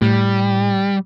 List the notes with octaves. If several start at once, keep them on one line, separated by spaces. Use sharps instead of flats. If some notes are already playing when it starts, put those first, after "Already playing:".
A2 G3